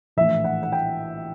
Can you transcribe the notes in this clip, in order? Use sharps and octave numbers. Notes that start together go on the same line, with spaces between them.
A#1 A2 E3 E5
F#5
F#5
G5